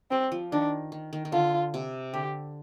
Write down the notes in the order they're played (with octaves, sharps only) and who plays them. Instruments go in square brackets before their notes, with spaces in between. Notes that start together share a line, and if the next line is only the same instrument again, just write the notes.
[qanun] G3 [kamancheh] C4
[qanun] F3
[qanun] D#3 [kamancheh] D4
[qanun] D#3
D#3
D#3
[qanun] D3 [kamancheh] F4
[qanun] C3
[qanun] D3 [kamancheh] G4